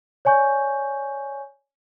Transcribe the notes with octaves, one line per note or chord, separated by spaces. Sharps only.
C#5 D5 G#5 C#6 G6